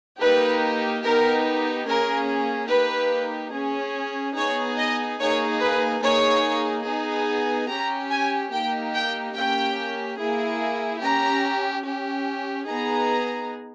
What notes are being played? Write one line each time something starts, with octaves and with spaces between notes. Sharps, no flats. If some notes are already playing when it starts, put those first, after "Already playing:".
A#3 D#4 G4 B4
B3 D#4 G4 A#4
A#3 C#4 G#4 A#4
A#3 D#4 G4 B4
C#4 G#4
B3 D#4 G#4 C#5
D#5
A#3 D#4 G#4 C#5
B4
A#3 D#4 G#4 C#5
B3 D#4 G#4
C#4 G4 A#5
G#5
A#3 D#4 G4 G5
G5
A#3 C#4 G4 G5
A#3 E4 G#4
C#4 G4 A#5
C#4 G4
B3 D#4 G#4 A#5